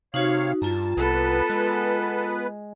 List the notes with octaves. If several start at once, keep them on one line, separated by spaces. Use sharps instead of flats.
C3 D#4 F#4 C#5 F5
G2 F4 A5 A#5
C2 B3 A4 B4
G#3